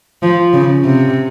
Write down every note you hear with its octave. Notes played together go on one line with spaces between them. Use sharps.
F3
C#3
C3